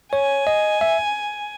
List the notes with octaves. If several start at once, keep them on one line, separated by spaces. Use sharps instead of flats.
C#5 G#5
D#5
E5